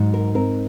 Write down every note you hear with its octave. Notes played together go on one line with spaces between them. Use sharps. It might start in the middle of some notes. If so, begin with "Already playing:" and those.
Already playing: G#2 F#3
A#4
C4 A#4